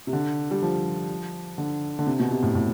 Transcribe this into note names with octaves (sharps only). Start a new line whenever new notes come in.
C3
D3
G3
F3
D3
D3
C3
B2
C3
A2
A2